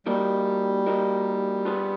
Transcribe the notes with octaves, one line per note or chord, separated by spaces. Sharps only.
G3 A#3 D#4 F#4 A#4 D#5
A#3 D#4 F#4 A#4 D#5
B3 D4 F4 G#4 B4